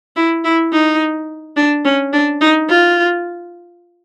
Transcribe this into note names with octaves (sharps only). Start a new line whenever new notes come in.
E4
E4
D#4
D4
C#4
D4
D#4
F4